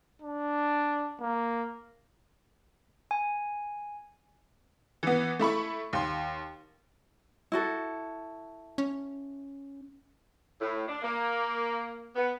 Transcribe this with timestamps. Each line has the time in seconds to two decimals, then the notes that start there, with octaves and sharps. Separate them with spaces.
0.22 D4
1.20 A#3
3.11 G#5
5.03 E3 B3
5.39 A3 E4 B5 C#6
5.93 D#2 C6
7.52 E4 F#4 A4
8.78 C#4
10.60 A2
10.87 D4
11.02 A#3
12.15 B3